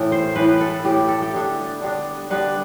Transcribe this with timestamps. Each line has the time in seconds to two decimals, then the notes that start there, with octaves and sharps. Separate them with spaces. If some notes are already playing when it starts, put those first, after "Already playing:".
Already playing: A2 E3 A3 E5
0.12 C5
0.36 A2 E3 A3 B4
0.49 B4
0.61 A4
0.85 A2 E3 A3 G4
1.08 A4
1.22 G4
1.33 D3 G3 B3 D4 A4
1.81 D3 G3 B3 D4
2.30 D3 G3 B3 D4 B4